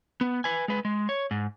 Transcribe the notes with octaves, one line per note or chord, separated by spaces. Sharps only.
B3
B4 G#5
G#3 B4
G#3
C#5
G#2